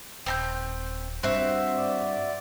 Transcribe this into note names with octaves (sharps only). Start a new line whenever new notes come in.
D#1 C4 A#5 G6
G2 C4 F#4 E5
D5